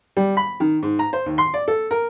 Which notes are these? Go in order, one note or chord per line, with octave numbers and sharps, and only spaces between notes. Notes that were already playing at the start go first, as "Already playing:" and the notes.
G3
B5
D#3
G#2
A#5
C5
D#2
C6
D5
A4
A#4